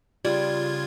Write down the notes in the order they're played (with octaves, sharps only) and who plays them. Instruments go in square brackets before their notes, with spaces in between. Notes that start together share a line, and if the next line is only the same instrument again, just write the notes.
[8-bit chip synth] C#3 F4 G#6 [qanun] G3